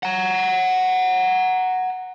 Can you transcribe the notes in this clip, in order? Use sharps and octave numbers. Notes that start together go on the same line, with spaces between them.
F#5 A#5